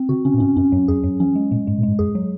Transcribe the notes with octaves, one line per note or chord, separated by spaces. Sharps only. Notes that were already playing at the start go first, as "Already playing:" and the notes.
Already playing: C4
C#3 F#4
C#3 C#4
A#2
G#2 C#4
F#2 C#4
F#2 F#3
F2 G#4
F#2 F#3
F3 C#4
G#3
A#2 G#3
G#2 G#3
A#2
G#2 G#3
F#2 G#4
F#3